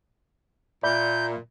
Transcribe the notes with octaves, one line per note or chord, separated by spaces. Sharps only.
A#2 D5 E5 B5 G6